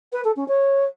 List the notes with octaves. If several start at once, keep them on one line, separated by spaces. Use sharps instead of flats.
B4
A4
C#4
C#5